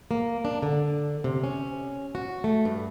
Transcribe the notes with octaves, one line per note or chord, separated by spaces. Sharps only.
A#3
D4
D3
C3
C#4
F#4
A3
G2